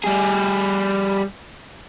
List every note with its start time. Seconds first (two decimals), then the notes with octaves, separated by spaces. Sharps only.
0.04 G3 G#4